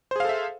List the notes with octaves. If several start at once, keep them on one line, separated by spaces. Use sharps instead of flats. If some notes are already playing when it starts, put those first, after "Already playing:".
G#4 A4 C5 E5 F5